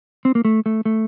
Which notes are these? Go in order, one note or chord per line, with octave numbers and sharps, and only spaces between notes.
C4
A#3
A3
A3
A3